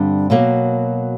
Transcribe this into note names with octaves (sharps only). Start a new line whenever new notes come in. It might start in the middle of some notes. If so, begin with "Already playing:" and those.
Already playing: G2 D3 G3 C4
B2 F#3 A#3